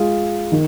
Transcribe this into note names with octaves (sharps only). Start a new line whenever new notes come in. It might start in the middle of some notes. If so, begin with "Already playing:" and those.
Already playing: G#3 F4 G#4
D#3